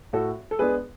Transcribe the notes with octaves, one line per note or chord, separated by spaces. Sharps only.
A2 F#4 A4
A4
G#3 B3 D4 G#4 B4